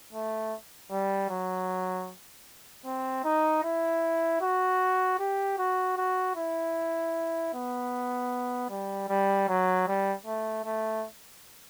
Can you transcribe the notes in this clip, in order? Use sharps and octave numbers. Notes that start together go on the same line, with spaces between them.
A3
G3
F#3
C4
D#4
E4
F#4
G4
F#4
F#4
E4
B3
G3
G3
F#3
G3
A3
A3